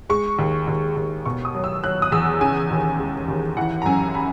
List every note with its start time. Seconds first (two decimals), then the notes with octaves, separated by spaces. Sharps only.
0.10 G#3 C#6
0.39 D#2
0.67 D#2
0.97 D#2
1.26 B2 C#6
1.45 D#6
1.55 F#3
1.64 E6
1.84 F#3 F#6
2.02 D#6
2.12 E2 E6
2.41 C#3 G#5
2.70 D#2
2.99 G#3
3.28 D#2
3.57 E3 F#5
3.82 A#5
3.86 F#2 G#5
4.15 B5